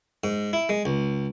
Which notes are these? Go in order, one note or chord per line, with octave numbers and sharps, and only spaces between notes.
G#2
E4
G#3
C#2